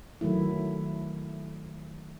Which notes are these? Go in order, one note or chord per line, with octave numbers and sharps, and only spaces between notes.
D#3 F#3 A3 E4